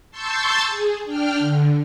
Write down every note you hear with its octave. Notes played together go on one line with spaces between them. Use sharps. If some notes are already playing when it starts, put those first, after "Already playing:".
A5 C6 C#6 E6 G6 A6
G#4
D4 G5 F6
D3